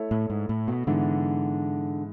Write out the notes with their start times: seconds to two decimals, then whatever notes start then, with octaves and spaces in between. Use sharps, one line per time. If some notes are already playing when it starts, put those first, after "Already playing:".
Already playing: A3 E4 A4 C#5 E5
0.11 A2
0.30 G#2
0.49 A2
0.68 B2
0.87 G#2 D3 E3 B3